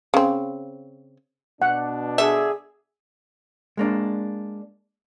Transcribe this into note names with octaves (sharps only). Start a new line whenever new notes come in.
C#3 C4
B2 D4 F#5
D3 G#4 E5
G#3 A#3 D4